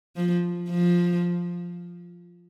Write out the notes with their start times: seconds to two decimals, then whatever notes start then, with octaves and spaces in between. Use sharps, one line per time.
0.16 F3
0.70 F3